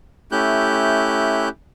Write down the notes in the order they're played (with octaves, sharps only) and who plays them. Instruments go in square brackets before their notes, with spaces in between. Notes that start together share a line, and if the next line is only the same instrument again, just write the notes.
[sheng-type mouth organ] A3 C#4 E4 G4 F#6 G6